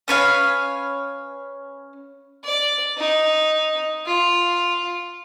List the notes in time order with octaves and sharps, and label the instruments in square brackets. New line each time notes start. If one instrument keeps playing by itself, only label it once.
[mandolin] C#4 B4 C#5 F5
[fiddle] D5
D#4
F4